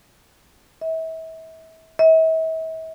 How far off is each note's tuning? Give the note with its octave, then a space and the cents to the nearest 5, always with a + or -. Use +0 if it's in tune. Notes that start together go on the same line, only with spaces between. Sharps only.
E5 -35
E5 -40